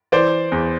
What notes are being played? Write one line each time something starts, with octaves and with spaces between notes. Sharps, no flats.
E3 C5 D5
E2